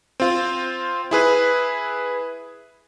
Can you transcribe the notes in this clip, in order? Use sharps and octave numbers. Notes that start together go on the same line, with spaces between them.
C4 F4
E4 G#4 B4